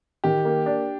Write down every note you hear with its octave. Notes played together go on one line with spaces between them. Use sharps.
D#3 G4
A#3
D4